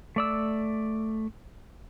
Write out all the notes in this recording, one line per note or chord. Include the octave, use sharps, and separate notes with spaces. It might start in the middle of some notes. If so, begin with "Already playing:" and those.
A3 D5 E6